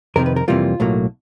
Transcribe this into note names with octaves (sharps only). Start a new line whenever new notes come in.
F2 C3 D#3 A#4
B4
A#4
F2 C3 E3 G3 A#3 F4
B1 A2 F#3 A#3